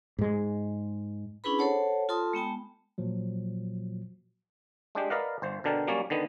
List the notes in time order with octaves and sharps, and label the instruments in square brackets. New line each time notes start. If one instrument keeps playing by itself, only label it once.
[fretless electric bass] G#2 G#3
[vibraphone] C#4 D4 E4 G#4 B4 B5
A4 C5 C#5 F#5 A5
F4 A4 A5 C6 D#6
G#3 B3 G5 A5
[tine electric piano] A#2 F3 F#3
[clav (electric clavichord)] G#3 D4 G4
A#4 B4 D5 D#5 F5 F#5
G1 C5
B2 D3 D4 A#4 G5 A5
F#3 G3 A#3 C#4 C#5 D5
D3 D#3 B3